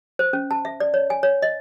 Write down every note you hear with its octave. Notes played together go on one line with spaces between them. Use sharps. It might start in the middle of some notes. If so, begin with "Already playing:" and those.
C5
C#4
A5
E5
D5
C#5
G#5
C#5
D#5